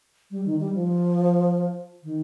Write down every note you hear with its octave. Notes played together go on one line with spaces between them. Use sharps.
G3
D#3
G3
F3
D#3